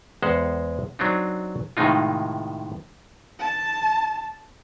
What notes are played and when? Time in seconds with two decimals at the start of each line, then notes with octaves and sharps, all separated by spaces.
0.22 E2 G#3 C5 F#5
0.99 F#3 C4 D4 D#4
1.77 A2 C3 D#3 G#3 D#4 F4
3.40 A5